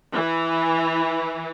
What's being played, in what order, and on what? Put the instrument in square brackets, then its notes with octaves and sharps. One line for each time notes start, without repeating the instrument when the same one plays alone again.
[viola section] E3